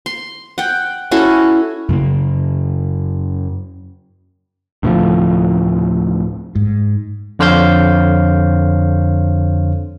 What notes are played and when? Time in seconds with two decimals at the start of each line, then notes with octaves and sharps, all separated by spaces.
0.06 C6
0.58 F#5 G5
1.11 C#4 E4 F#4 A4
1.88 F#2 C#3 A#3
4.83 D2 A2 C3 F3
6.55 G#2
7.39 F2 D3 C5 C#5 F5 G6